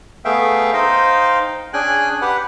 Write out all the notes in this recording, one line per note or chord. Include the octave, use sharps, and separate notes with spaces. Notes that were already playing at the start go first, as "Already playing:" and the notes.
A3 B3 G#4 E5 F5 G5
D#4 C5 D#5 F5 G5
C#4 D4 G#4 G5 G#5 F#6
G4 B4 F#5